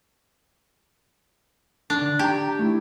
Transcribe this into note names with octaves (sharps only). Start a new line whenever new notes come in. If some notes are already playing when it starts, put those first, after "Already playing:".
D4
D3
G4 A5 A#5
A3 E4